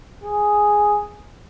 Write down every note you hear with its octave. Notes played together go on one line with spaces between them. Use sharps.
G#4